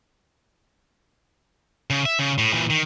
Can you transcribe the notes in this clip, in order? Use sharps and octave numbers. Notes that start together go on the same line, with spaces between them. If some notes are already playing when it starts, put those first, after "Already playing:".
C#3
E5
C#3
A2
A#2 E3
D#3